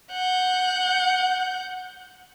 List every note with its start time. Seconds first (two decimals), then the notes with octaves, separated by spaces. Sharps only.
0.11 F#5 G6